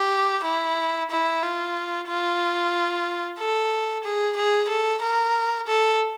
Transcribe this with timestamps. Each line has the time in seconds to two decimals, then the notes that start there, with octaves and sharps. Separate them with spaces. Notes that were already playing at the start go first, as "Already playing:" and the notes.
Already playing: G4
0.44 E4
1.10 E4
1.42 F4
2.08 F4
3.39 A4
4.04 G#4
4.37 G#4
4.68 A4
5.02 A#4
5.67 A4